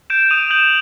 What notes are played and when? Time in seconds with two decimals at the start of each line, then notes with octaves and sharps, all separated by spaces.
0.10 G6 D7 E7
0.30 D#6 D#7 F7
0.50 G6 E7 F#7